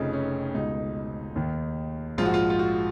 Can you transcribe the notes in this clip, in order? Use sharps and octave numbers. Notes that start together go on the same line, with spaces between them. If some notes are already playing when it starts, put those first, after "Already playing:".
Already playing: F1 F2 C#3 D#4
C#4
C#2 B2 D#4
D#2 D#3
A#1 G#2 F3 F4
F#4
F4
F4
F#4